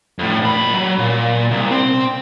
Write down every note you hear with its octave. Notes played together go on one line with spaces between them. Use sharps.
F2 A2
A#2 B5
F#3
A#2
C2
C4